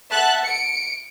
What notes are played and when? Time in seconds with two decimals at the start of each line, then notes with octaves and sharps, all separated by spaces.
0.10 E5 F#5 A5 F#6
0.44 C#7 D7